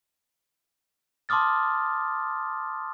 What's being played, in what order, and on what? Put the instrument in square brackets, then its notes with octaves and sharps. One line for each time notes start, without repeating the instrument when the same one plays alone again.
[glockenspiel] A5 C6 D6 D#6 F6 A6